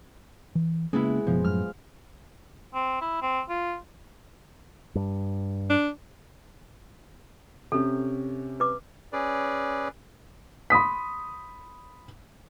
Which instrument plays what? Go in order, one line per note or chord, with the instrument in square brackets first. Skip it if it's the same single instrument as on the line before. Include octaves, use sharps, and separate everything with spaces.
[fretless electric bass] E3
[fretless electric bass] C#3 A#3 C#4 [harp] G#3 B3 E4
[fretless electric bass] F#1 B2 [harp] F3
[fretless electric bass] F#2 A2 [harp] F6
[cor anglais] C4
E4
C4
F4
[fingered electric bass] G2
[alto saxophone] D4
[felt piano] C3 C#4 G4 [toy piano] A4
[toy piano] B4 D6
[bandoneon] C#4 G#4 B4 D5
[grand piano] B5 C6 D#6 B6